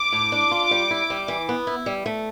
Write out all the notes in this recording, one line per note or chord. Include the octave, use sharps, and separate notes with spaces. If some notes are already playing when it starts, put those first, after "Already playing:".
Already playing: D6
A2
D4
F4
G3
E4
G3
E3
B3
E4
G3
A3